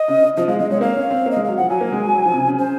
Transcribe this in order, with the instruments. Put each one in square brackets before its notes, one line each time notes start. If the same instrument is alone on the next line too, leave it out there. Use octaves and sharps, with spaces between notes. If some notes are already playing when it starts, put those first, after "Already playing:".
Already playing: [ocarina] D#5
[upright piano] C#3
C#3
[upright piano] F3 [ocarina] D#5
[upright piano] G#3 [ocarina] F5
[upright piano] G#3 [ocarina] D#5
[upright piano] G#3 [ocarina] C#5
[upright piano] C4
[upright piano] A#3 [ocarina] F5
[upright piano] C#4
C4
A#3
[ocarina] D#5
[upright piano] G#3
[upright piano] F#3 [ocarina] F5
[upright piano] F3 [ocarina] F#5
[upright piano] F#3 [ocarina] G#5
[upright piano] A#3
G#3
F#3
F#3
F3
C3
C#3
C#3
[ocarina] C5